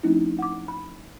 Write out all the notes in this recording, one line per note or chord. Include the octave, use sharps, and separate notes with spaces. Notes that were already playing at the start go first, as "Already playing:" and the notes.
F3 A3 C4 C#4 D#4 E4
F#5 D6
B5